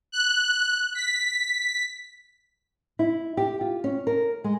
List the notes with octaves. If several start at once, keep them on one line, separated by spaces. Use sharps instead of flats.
F#6
B6
E4
G4
F4
C#4
A#4
G#3